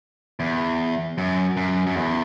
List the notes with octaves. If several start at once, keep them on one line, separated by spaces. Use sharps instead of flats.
E2
F#2
F#2
F#2
E2